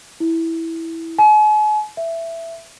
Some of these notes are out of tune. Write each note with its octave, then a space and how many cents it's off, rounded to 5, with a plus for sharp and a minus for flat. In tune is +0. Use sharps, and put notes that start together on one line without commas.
E4 -5
G#5 +40
E5 +10